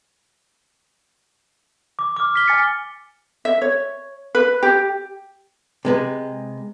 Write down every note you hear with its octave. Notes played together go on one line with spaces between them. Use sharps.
D6
D6 F6
F6 B6 G7
G#5 A6 C#7
E5
C#5
B4
G4
C3 G#3 B4